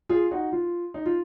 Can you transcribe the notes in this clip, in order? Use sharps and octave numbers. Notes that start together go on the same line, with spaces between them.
F4 G#4
D#4 F#4
F4
D#4
F4